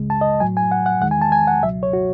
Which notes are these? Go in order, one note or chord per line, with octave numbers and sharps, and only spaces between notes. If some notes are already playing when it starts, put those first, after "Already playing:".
Already playing: C#2 C#3 G#3
A5
D#5
A2 F#3 G#5
G#5
F#5
F#5
E2 D#3 G#3 F#5
G#5
A5
G#5
F#5
C#2 B2 F#3 E5
C#5
F#4